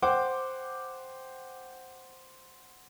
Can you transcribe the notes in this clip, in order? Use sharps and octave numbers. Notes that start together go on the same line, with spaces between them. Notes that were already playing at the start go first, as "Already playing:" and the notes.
C5 F#5 G5 D6